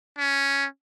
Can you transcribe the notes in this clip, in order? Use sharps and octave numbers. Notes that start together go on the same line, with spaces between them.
C#4